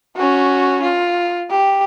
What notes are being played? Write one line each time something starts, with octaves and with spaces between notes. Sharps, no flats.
C#4 F#4
F4
G4